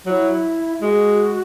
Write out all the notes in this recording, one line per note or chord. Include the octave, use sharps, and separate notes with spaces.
F#3 E4 F#4
G#3 F#4